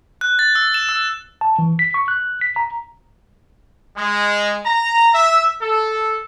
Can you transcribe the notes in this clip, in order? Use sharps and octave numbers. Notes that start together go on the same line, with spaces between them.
F#6
A6
E6
E7
E6
A5
E3
B6
C#6
F#6
B6
A#5
G#3
A#5
E5
A4